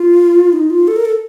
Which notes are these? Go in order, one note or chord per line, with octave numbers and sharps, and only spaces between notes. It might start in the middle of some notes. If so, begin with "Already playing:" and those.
Already playing: F4
D#4
F4
A4
A#4
A4